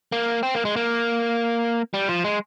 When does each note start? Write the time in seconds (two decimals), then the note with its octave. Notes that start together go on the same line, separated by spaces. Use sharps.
0.12 A#3
0.43 C4
0.55 A#3
0.65 G#3
0.76 A#3
1.94 G3
2.09 F3
2.24 G#3